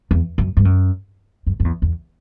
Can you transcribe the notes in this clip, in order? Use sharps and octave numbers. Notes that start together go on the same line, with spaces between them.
E2
F#2
G2
F#2
F#2
F#2
E2
E2